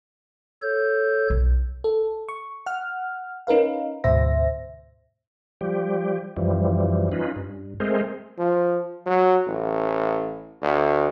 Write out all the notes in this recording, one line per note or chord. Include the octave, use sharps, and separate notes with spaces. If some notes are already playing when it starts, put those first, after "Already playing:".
A4 C#5 G6
B1
A4
C#6
F#5 F6
C#4 D#4 A#4 B4 F5
D2 G#2 B2 C5 E5 A#6
F3 G3 G4
F#2 E3 F3 G3
C#4 D#4 F4 B4
G2
G#3 A3 C4 G#4 A#4 C5
F3
F#3
A1
D2